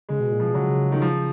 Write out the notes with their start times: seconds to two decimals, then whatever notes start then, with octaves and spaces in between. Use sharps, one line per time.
0.09 C#3 G#3
0.20 B2
0.32 A#2
0.40 B2 F3
0.54 C#3 F#3
0.92 D#3
1.02 F3